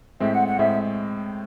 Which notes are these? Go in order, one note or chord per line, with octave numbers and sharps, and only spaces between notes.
A2 G#3 C4 E5
F#5
F#5
A2 G#3 C4 E5